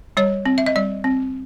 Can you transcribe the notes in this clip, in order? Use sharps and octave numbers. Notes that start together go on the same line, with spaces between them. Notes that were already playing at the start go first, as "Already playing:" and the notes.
G3 C#5
C4
E5
D#5
G3 D5
C4